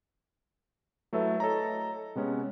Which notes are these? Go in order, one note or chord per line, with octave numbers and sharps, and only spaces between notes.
F#3 A3 E4 A4 B4 E5
A4 C#5 D#5 A#5
C3 G#3 B3 C#4